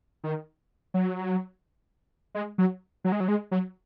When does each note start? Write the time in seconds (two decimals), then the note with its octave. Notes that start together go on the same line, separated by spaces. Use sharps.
0.24 D#3
0.94 F#3
2.35 G#3
2.58 F#3
3.04 F#3
3.12 G#3
3.20 F#3
3.28 G#3
3.51 F#3